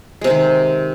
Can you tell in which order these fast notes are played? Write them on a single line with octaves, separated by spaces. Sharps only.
G#3 C3 C4 D#3